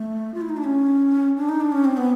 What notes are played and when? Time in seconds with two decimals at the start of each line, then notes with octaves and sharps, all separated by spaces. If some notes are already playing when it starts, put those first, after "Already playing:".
Already playing: A3
0.34 F4
0.41 E4
0.49 D#4
0.57 D4
0.64 C#4
1.37 D4
1.49 D#4
1.61 D4
1.72 C#4
1.85 C4
1.97 B3